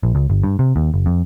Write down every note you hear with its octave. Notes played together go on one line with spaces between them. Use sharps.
A#1
C#2
G1
G2
C3
D#2
F#1
F2